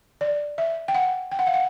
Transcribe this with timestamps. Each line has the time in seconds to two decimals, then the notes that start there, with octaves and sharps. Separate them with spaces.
0.21 D5
0.58 E5
0.88 G5
0.95 F#5
1.31 G5
1.39 F#5
1.47 F5
1.54 F#5